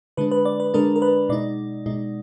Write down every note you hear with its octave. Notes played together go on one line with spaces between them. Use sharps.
D3 G#3 D4 B4
B4
D5
B4
D3 G#3 D4 A#4
A#4
B4
B2 G#3 D#4 D5
B2 G#3 D#4